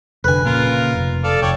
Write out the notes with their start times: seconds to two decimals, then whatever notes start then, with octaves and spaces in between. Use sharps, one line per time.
0.24 F1 D3 B4 G#5
0.46 A#2 C#3 F4 A#4
0.94 F1
1.24 A4 D5 F5
1.42 F1 C#5 D5 G5